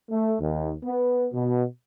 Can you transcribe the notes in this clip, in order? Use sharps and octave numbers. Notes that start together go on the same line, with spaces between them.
A3
D#2
B3
B2